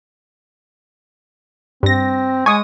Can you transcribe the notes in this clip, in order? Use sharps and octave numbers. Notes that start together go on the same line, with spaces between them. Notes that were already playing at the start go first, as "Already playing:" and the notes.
G2 C4 A#6
G#3 G#5 C#6 D#6